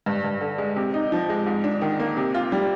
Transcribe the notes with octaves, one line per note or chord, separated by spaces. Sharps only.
G2
G2
D3
G#3
C3
D#4
F3
G#3
G#2
D4
D#3
A#3
C3
F4
G3